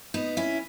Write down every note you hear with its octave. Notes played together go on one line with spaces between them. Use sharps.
B3 D#4
C#4 E4